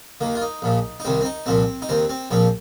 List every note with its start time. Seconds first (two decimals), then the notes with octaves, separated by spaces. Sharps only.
0.21 D#2 D#3 A#3
0.35 F4
0.42 D#4
0.62 A#1 A#2 F3
1.00 D#4
1.05 C2 C3 D#3 C4
1.21 C4
1.25 D#4
1.46 C2 A#2 F3 C4
1.82 D#4
1.89 D#2 D#3 C4
2.09 C4
2.31 A#1 A#2 F3 C4